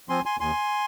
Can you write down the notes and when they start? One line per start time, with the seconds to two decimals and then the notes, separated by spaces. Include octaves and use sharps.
0.09 F3 C4 G#5 C6
0.26 G#5 C6
0.40 D#2 G#5 C6